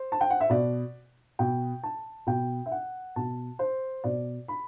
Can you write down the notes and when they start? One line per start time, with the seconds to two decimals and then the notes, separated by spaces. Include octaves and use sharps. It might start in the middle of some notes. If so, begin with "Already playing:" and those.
Already playing: C5
0.12 A5
0.21 G5
0.30 F#5
0.41 E5
0.50 B2 D5
1.39 B2 G5
1.83 A5
2.27 B2 G5
2.66 E5
2.72 F#5
3.16 B2 A5
3.59 C5
4.04 B2 D5
4.48 B5